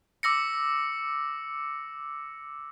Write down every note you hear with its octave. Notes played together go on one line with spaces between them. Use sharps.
D6 E6 A#6 C#7